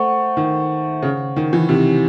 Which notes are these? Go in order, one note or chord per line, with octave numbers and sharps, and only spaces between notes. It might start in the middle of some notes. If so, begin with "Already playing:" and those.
Already playing: A3 C5 F#5 C#6
D#3
C#3
D#3
E3
C3